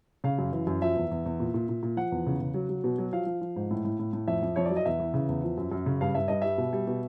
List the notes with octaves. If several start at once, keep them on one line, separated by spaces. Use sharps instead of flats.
C#3 F5
F#2
E3
F#2
F3 E5
E2
E2
E2
A#2
A#2
A#2
A#2
F3 F#5
E2
C#3
C#3
F#3
F#3
B2
F#3
F3 F5
F3
F3
G#2
A2
A2
A2
A2
F2 E5
F2
F2 C#5
D5
F#3
D#5
E2 E5
E3
C#3
E2
F3
F#2
F#2
C#3
G2 F5
G2 E5
G2 D#5
G3 E5
B2
G3
B2